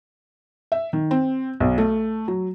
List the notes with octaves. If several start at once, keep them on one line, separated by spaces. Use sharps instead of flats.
E5
D#3
C4
B1
A3
F#3